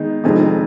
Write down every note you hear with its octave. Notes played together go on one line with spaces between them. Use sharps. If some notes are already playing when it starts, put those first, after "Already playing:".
Already playing: D#3 G#3 B3 D#4
F1 F2 D#3 G#3 C4